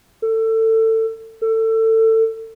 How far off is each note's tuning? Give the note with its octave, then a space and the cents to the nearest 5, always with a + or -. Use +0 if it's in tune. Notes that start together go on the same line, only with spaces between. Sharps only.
A4 +25
A4 +25